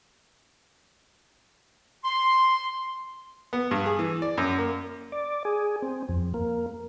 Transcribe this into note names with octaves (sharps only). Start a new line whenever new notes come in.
C6
B3
G2
G#4
E3
D5
F#2
A#3
D5
G#4
C4
F2
A#3